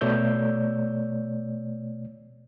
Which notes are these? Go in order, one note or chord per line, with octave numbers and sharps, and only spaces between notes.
B2 A3 C#5 D5 E6 G6